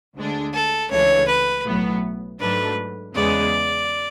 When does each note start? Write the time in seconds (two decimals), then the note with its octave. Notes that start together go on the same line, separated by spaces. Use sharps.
0.16 D2 D3 G#3 D4
0.54 A4
0.91 C#2 C#3 E3 A3 D4 C#5
1.29 B4
1.65 B1 A2 F#3 B3
2.40 G#2 F#3 A3 D4 B4
3.15 E2 C#3 G#3 B3 D5